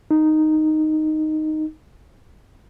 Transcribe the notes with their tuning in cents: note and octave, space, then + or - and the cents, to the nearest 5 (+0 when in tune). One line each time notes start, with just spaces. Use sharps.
D#4 -5